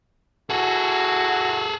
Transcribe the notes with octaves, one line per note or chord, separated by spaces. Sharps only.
E4 F#4 G#4 A4